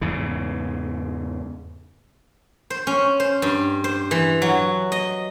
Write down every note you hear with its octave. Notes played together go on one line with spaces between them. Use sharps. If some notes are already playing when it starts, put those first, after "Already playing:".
E2 G#2 C#3
C5
C#4
C5
G2
C5
E3
F#3
D#5